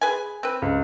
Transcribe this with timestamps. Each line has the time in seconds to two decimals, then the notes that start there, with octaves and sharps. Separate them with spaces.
0.01 G#4 B4 G#5
0.43 C4 B4
0.62 C#2